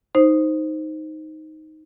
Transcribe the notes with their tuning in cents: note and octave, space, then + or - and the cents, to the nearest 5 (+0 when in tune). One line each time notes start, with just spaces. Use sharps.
D#4 +5 C5 +0